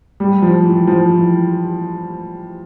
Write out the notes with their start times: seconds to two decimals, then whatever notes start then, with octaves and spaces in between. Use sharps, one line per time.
0.20 G3
0.42 F3
0.65 E3
0.87 F3
1.10 E3